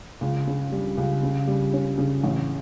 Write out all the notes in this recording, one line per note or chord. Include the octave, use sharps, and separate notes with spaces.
C#2
C#3
G3
C#2
C#3
G3
C#4
C#3
A1